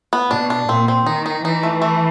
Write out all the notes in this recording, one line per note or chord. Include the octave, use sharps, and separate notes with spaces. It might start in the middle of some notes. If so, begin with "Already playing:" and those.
B3
B2 D4
D4
A#2 C4
C4
D#3 D#4
D#4
E3 D#4
A3
A3